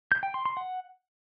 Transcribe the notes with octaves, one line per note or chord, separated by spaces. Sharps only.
G6
G5
C6
C6
F#5